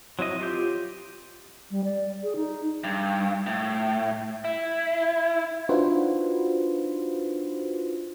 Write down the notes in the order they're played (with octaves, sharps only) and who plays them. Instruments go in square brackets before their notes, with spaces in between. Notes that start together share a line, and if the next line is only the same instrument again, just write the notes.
[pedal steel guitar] F#3 C4 E4 D#5
F4 G4 G6
[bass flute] G3
D5
G#4
D#4
[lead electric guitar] G2
A2
E4
[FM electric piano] D4 D#4 F4 F#4 B4 C5